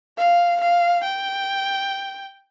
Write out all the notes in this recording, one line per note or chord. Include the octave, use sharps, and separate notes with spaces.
F5
F5
G5